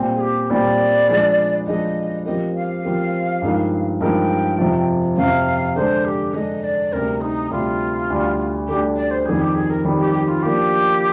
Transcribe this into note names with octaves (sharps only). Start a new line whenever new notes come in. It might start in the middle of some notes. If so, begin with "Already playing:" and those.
Already playing: A#2 G3 C4
G#4
G4
A#2 G3 C4 D5
F3 G#3 D4 G#4
F3 G#3 D4 G#4 D#5
F3 C4 G4 A#4 D#5
F5
F3 C4 G4 A#4
G2 F3 G#3 D#4 A#4
G2 F3 G#3 D#4 A#4 G5
F2 C3 F3
F2 C3 F3 F5
D3 G#3 D4 C5
G4
D3 G#3 D4 D#5
D5
D2 C3 G3 A#4
D#4
D2 C3 G3 F4
D2 D3 G3 D4
D2 D3 G3 D4 G4
D5
C5
F2 D#3 G3 G#4
G4
G#4
A#4
F2 D#3 G3
G4
G4
F4
F3 A#3 D4 G4